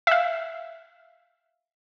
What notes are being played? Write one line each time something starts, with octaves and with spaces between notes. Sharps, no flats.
E5 F5